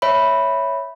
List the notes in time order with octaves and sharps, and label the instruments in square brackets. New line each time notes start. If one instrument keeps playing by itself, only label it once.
[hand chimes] C#5 E5 B5